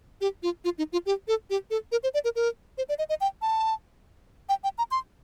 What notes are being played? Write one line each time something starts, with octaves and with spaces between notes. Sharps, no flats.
G4
F4
F4
D#4
F4
G4
A4
G4
A4
A#4
C5
D5
A#4
A#4
C5
D5
D#5
D#5
G5
A5
G5
G5
A#5
C6